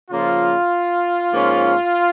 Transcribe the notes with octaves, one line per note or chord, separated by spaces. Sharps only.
C#3 F3 A#3 F4
G#2 F3 A#3 C#4